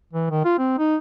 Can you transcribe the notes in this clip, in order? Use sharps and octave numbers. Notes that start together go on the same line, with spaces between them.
E3
D#3
F4
C4
D#4